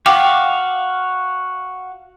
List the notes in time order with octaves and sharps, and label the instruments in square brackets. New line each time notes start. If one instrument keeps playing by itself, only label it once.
[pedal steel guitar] F#4 F5 [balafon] G5 D6